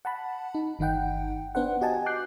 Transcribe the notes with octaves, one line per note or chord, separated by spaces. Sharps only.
F#5 A5 B5
D#4
G1 D#3 D#4 F#5 G5
B3 D4 B4 C5 F#5
F#4 G4 D#5 G#5 A5
D6 F#6 G6 C7